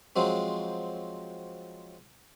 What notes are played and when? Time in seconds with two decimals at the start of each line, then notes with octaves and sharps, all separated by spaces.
0.16 F3 F#3 G#3 C4